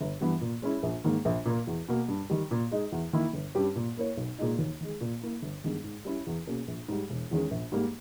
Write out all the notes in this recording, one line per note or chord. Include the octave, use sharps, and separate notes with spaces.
G1
G2 E3 G3 B3
A#2
G#3 C#4 E4
A#1
G#2 D#3 A#3
A#1
A#2 A#3
E2
B2 A#3
G2
D#3 G3
A#2
G#3 D#4
E2
D#3 A#3 E4
G1
G2 G3 C#4 G4
A#2
A#3 E4 A#4 C#5
B1
A#2 G#3 D#4
D#2
D#3 G#3
A#2
A#3 E4
G1
G2 D#3 G#3 B3
G#2
G3 C#4 E4
E2
B2 A#3 C#4 G#4
A#1
G#2 G3
E1
E2 D#3 G#3 C#4
A#1
G#2 G3 A#3